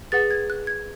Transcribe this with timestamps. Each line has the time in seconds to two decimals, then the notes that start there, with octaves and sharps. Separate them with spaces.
0.12 G#4 B4 F#5 A6
0.31 G#6
0.50 F#6
0.67 G#6